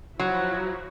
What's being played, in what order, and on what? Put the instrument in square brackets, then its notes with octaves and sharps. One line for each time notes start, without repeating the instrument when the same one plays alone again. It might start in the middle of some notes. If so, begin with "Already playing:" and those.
[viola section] F3 E4 F#4 [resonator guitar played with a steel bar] F#3